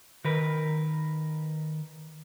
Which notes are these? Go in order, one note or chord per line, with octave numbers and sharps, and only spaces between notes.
D#3 A#4 B4